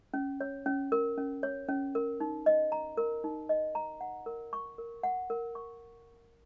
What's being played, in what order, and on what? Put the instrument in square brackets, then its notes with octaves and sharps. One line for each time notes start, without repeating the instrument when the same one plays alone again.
[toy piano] C#4
C#5
C#4
A#4
C#4
C#5
C#4
A#4
D#4
D#5
A#5
A#4
D#4
D#5
A#5
F#5
A#4
C#6
A#4
F#5
A#4
C#6